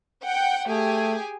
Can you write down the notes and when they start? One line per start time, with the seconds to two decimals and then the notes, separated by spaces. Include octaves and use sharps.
0.25 F#5 G5
0.68 A3 G4 G#4 G#5